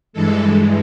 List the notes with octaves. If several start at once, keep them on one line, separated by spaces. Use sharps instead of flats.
G2 E3 G#3 A4